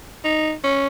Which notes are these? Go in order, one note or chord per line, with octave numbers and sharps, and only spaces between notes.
D#4
C#4